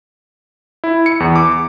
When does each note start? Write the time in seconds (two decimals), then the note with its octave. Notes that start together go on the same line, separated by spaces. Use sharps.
0.84 E4
1.06 C#7
1.20 E2
1.36 D6